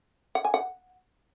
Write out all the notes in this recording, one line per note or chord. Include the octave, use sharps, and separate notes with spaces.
F#5
G#5
F#5